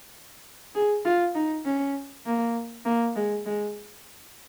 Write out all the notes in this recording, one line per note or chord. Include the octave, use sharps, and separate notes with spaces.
G#4
F4
D#4
C#4
A#3
A#3
G#3
G#3